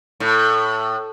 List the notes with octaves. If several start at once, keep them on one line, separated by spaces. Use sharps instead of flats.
A2